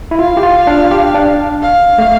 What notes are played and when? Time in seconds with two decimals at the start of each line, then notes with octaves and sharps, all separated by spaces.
0.11 E4
0.19 F4 F5
0.37 G4
0.43 F4
0.67 D4
0.91 G4
1.14 D4
1.63 F5
1.98 A3